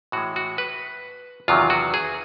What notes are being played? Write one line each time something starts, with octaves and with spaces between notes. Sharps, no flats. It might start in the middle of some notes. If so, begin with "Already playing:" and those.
A2 E3 G#3 F#4
F#4
B4
E2 C3 D#3 F#3 F4
F#4
G#4